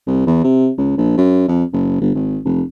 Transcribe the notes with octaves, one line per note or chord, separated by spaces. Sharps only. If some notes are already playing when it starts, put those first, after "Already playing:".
C2
E2
C3
C#2
A#1
F#2
F2
F#1
G1
G#1
F1